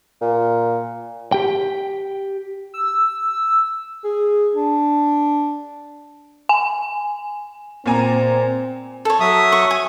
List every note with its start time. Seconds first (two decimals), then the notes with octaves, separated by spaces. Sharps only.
0.21 A#2
1.32 G4 G5
2.74 E6
4.04 G#4
4.55 D4
6.49 G#5
7.86 A#2 C4 G#5 A#5
9.05 A4 C#5
9.20 F#3 E5 D#6
9.52 C#6
9.71 G#5